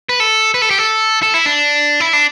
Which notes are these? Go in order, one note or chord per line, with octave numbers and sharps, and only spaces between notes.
B4
A4
B4
A4
G4
A4
A4
E4
D4
E4
D4